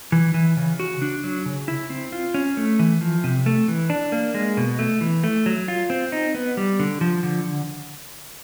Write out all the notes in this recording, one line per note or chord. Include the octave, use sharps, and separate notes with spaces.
E3
E3
C#3
F#4
D4
F#3
C#3
E4
C4
F4
C#4
A3
E3
F3
C3
A3
E3
D4
A#3
G#3
B2
A3
E3
A3
F#3
F4
C4
D#4
B3
G3
D3
F3
D3